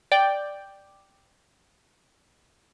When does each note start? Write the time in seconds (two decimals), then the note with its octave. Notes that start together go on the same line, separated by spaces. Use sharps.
0.12 D5 G5